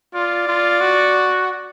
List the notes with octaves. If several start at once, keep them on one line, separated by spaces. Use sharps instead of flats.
F4 D5
F4
F#4